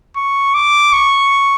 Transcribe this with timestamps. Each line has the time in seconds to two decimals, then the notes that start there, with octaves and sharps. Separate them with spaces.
0.16 C#6
0.54 D6
0.93 C#6